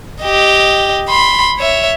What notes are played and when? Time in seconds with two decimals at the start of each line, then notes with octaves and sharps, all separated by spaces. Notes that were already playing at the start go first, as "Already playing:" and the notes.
0.23 G4 D#5
1.09 B5 C6
1.59 C#5 E5